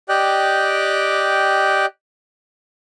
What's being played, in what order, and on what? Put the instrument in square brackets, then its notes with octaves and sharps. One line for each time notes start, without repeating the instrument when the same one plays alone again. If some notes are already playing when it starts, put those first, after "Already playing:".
[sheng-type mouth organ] G4 D5 D#5 G5 F#6